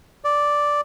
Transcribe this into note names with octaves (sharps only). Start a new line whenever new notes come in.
D5